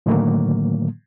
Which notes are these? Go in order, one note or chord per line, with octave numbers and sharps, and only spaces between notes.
A2 D3 D#3 F#3 A3 A#3